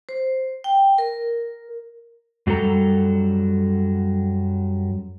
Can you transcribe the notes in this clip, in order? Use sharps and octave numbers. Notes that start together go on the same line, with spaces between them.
C5
G5
A#4
F#2 F#3 G3 A4 A#5